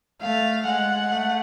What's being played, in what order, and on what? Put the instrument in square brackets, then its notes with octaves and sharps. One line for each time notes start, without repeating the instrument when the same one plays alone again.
[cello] A3 [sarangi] F5
[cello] G#3 [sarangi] F#5
[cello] A3